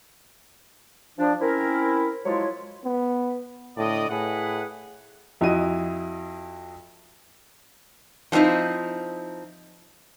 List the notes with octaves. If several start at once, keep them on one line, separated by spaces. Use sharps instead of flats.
F3 D4
C4 C#4 E4 A#4
F3 F#3 G#3 E4 F4 C#5
B3
A2 D3 D5 D#5
A2 G#4 B4 F#5
F2 E4 F#4 D#5 D#7
F3 F#3 C4 D#4 E4